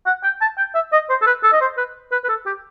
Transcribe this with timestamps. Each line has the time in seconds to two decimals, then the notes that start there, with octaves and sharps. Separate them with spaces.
0.07 F#5
0.23 G5
0.41 A5
0.58 G5
0.75 E5
0.92 D#5
1.09 C5
1.22 A4
1.27 B4
1.43 A4
1.53 D#5
1.61 C5
1.78 B4
2.12 B4
2.24 B4
2.29 A4
2.46 G4